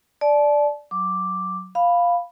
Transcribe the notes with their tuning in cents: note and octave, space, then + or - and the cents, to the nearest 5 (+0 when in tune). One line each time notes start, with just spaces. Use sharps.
D5 +0 A5 -30
F#3 +0 D6 +0
F5 +0 B5 +0